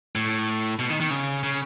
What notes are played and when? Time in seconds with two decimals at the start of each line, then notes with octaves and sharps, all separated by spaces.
0.15 A2
0.79 B2
0.90 D#3
1.00 D#3
1.11 C#3
1.43 C#3